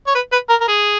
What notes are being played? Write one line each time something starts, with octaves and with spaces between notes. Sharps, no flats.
C#5
B4
B4
A#4
A#4
G#4